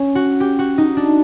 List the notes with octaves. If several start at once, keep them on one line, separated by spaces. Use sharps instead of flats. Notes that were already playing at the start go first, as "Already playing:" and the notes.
Already playing: C#4
F#4
G4
F#4
D#4
D4